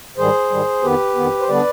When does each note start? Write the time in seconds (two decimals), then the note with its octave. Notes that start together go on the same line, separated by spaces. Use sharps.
0.17 G#2 D#3 G3 G#4 C5
0.50 G#2 D#3 G3
0.83 F2 D#3 B3 G4 B4
1.15 F2 D#3 B3
1.40 C5
1.48 D3 G3 B3 D4 B4 D5